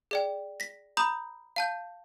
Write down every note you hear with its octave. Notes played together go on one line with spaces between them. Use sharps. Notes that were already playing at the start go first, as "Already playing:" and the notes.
G#4 D5 G5
A#6 B6
A#5 B5 D#6 G6
F5 A5 G6